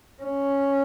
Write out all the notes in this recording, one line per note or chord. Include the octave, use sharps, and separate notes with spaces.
C#4